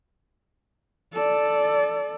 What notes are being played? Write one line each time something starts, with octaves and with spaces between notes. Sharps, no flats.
A4 D5